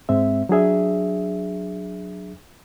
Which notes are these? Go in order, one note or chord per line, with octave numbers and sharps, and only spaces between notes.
G#2 G#3 C4 E5
F#3 D4 G#4 E5